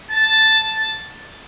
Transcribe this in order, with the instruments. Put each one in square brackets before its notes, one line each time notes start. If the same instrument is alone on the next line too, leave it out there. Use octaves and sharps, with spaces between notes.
[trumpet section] A5